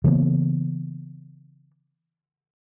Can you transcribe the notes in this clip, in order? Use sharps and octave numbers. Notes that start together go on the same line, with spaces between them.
C#3 E3 A#3 B3